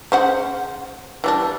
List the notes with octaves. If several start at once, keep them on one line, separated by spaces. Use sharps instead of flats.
C#3 C5 F#5
E3 G3 D4